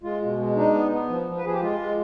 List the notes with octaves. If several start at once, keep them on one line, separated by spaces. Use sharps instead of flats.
G#3 F4
B2
G#3
D4 D#4
B3
B3
F3
F3
B4
F3 G#4
G4
G#3 F4
G#3